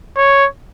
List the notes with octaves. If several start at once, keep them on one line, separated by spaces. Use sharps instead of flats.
C#5